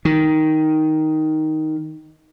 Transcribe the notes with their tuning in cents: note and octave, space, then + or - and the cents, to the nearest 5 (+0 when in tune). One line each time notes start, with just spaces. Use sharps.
D#3 +5